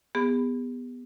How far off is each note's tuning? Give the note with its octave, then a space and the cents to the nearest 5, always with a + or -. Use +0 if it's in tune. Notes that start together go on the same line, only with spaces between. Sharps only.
B3 +0 G#4 -45